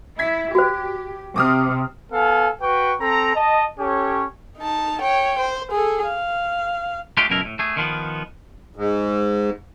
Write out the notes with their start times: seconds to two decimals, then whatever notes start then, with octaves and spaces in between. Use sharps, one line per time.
0.19 E4 G#6 B6
0.55 F#4 G4 C5
1.36 C3 D6 D#6 F6
2.13 B3 A4 F5 G#5
2.62 F#4 B4 G5 C#6
3.00 C4 A4 A#5
3.35 D#5 A5
3.79 C#4 G4 A4 C#5
4.57 D#4 A5
5.01 C#5 G5
5.39 C5
5.71 G#4 A4
6.06 F5
7.17 G#3 A3 D4 F4 G4
7.30 C#2 F#2 B2 E4 A#4
7.45 A2
7.59 A3 G#4
7.77 D#3 F3 B3
8.76 G#2